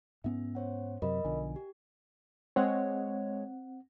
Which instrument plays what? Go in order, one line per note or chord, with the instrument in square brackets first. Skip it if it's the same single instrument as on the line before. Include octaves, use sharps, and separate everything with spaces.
[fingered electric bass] G#2 B3 C#4 [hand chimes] E5
[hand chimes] C5 C#5 F#5
[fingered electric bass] F#2 C3 F#3 [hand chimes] A#4 D#5 B5
[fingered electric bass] B1 D3 F3 [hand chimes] G#5
[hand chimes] G4
[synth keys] G#3 C#5 [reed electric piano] C4 F#5